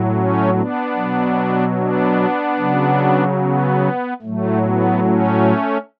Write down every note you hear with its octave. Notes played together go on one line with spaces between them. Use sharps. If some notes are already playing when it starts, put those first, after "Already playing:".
Already playing: A2 F#3
A3 C#4
B3 D4
B2 F#3
B3 D4
C#3 F#3
B3
A2 F#3 A3
B3
A3 C#4